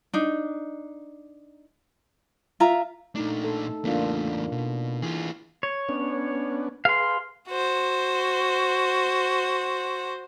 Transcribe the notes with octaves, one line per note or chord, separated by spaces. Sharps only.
D4 D#4
F4 E5 A#5
A#2 A3 D4 D#4
A4
E2 A3 A#3 D4 F4
B2
E3 F4 G#4
C#5
B3 C#4 D4
G#4 B4 F5 C6
F#4 C5